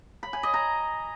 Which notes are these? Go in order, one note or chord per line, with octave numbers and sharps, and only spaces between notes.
B5
G#5
D#5
A#5